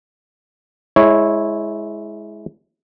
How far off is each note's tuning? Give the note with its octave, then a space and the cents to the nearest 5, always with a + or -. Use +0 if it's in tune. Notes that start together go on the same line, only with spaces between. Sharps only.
G#3 +15 E4 -10 C#5 -10